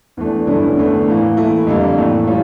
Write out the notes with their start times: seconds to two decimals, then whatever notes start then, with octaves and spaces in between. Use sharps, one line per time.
0.17 E2 E3 A3 D4
0.47 G2 D3 A3 C#4 E4
0.78 E2 D3 A3
1.08 A2 E3 A#3
1.37 E3 A3 E4
1.67 F2 D3 G3 A#3
1.97 A2 E3 A3
2.27 E3 G3 C#4 F4